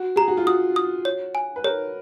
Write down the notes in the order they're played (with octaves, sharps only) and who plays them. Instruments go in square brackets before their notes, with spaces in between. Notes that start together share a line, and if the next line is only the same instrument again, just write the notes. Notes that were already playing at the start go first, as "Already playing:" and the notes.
Already playing: [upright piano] F#4
[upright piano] G#4 [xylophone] A#5
[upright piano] F#4
F4
[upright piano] F#4 [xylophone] D#6
[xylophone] D#6
C#5
G#5
[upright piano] B4
[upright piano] A#4 [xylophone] C#5